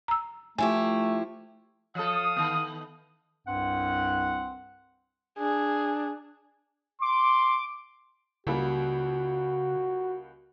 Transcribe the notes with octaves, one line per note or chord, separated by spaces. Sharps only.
A#5 E6
F3 A3 E4 G4 G#5
F3 A4 F5 D#6
D#3 B3
C2 G2 C4 F#5
D4 G#4
C6 D6
C#2 C#3 G3 A#3 F#4